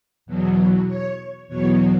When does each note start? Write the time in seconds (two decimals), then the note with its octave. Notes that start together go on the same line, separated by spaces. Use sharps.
0.26 E2 B2 F#3
0.87 C#5
1.48 E2 B2 F#3 C#5